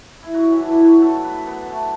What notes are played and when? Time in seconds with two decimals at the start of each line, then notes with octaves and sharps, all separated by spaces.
0.23 E4
0.34 F#3 F#4
0.51 E3 E4
0.60 D4
0.68 E3 E4
0.84 F#3 F#4
1.02 A3 A4
1.24 B3 B4
1.47 B3 B4
1.69 A3 A4